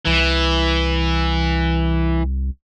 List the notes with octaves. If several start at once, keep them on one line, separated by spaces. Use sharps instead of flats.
C2 E3